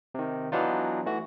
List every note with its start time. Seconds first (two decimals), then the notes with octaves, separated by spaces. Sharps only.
0.15 C3 D#3
0.52 E3 F#3 B3 D4 D#4 F4
1.06 E3 A3 F#4